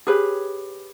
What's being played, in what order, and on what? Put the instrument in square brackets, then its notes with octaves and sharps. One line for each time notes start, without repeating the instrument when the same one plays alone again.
[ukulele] G4 G#4 B4 C#5